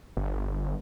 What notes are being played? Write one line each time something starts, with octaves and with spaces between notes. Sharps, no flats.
G1